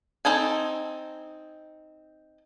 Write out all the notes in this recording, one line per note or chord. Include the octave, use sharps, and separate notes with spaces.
C4 D#4 A4 G#5